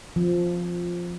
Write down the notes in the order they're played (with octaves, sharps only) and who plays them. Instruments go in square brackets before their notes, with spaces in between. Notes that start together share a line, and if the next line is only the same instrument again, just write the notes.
[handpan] F3